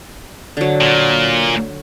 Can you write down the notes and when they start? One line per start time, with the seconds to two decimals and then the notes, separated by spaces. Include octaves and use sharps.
0.57 D3 F#3
0.81 A#2